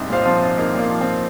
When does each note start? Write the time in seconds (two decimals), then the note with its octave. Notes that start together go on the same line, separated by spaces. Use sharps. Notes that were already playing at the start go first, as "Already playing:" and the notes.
Already playing: C2 G#2
0.10 A#2 C5 F5
0.21 D#4
0.25 F3 C4 F4
0.42 C2
0.58 C2 A#3 D#4
0.74 A#2
0.79 A#3
0.91 F3
1.01 C4